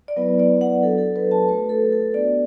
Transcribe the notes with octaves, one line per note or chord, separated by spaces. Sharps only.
D5
F#3 B3 E4 B4
D5
F#5
F#3 D4 F#4 A4
A4
B4
A5
A3 F#4 B4
A4
A4
B3 D4 F#4 D5